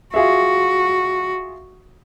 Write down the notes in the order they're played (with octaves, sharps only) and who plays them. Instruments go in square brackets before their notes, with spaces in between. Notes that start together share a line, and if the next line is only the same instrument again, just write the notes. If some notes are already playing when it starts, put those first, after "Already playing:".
[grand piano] F4 G#4 E5 [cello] F#4